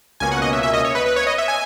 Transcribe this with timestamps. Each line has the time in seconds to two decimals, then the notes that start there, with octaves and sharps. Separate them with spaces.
0.20 C#2 B2 A#3 C#4 G#5
0.32 F#5
0.42 D#5
0.53 E5
0.63 E5
0.73 D#5
0.85 C#5
0.95 B4
1.06 B4
1.16 C#5
1.27 D#5
1.38 E5
1.48 G#5